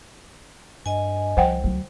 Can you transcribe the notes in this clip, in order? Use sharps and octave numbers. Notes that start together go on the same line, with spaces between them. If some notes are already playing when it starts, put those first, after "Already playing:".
G2 D#5 G#5
C2 F3 C5 F#5 G5
D2 F#3